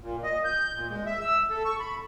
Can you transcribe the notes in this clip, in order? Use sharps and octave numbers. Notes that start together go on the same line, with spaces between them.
A#2
D#5
G6
A#2
G#3
E5
E6
A4
C#6
B5